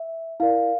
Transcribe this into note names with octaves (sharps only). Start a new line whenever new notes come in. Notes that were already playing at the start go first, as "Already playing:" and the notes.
Already playing: E5
E4 A#4 D5 F5